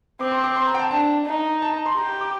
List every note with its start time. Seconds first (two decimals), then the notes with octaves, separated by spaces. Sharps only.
0.20 C4 D6
0.32 C6
0.44 D6
0.56 C6
0.67 A#5
0.74 G5
0.79 A5
0.91 D4 A5
1.27 D#4
1.62 A5
1.74 A#5
1.86 C6
1.97 G4 A#5
2.09 A#5
2.21 D6